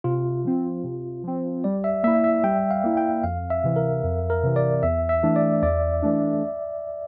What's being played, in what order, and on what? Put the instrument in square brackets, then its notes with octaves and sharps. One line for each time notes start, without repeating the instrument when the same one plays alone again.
[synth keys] C3 [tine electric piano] F4
[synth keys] F3 C4
C3
F3 C4
[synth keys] G3 [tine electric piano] D5
[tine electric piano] E5
[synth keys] A#3 E4 [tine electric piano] E5
[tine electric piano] E5
[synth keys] G3 [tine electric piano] G5
[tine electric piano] F5
[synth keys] A#3 E4
[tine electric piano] G5
[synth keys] F2 [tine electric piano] F5
[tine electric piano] E5
[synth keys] C3 E3
[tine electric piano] A#4
[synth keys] F2
[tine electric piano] A#4
[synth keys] C3 E3
[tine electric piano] D5
[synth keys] E2 [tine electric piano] E5
[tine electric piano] E5
[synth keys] E3 A3 D4
[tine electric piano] D5
[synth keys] E2 [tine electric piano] D5
[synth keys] E3 A3 D4